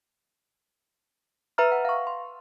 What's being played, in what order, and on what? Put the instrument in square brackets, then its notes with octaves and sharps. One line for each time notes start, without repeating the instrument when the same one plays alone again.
[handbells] B4 E5 A#5 F6
F#5
F5 C#6
C6